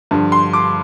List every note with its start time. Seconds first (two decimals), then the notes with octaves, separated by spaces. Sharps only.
0.11 G2 D3 F3
0.32 C6
0.53 D6